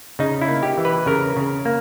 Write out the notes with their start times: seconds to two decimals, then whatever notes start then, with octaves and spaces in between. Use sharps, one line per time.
0.19 C#3 D#4
0.42 E4
0.48 A#3
0.63 G4
0.78 E3
0.85 B4
1.06 C#3 A#4
1.37 C#3
1.65 A#3